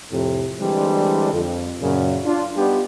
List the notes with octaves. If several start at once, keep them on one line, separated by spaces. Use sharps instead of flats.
F2 A2 C3
D3 E3 G3 G#3 C4 D4
F2
F#2 A#2 C#3
D4 F4
G3 B3 D4 D#4 F4 G4